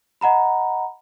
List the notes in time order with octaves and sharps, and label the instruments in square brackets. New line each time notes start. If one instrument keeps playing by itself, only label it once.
[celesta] D#5 F#5 A#5 B5